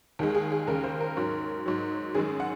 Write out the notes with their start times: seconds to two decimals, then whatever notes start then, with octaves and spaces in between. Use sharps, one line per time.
0.19 D#2 D#3 G#3
0.35 G#4
0.52 G#4
0.67 D#2 C#3 G#3 A#4
0.84 C5
1.00 A#4
1.17 G#2 F#3
1.66 G#2 F#3
2.15 F#2 D#3 G#3 G#4
2.40 F#5